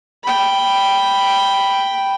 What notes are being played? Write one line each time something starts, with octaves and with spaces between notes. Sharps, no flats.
G5 B5